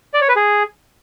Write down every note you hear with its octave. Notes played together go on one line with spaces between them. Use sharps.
D5
C#5
B4
G#4